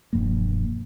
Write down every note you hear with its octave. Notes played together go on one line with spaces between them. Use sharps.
E1 G2 F3 A#3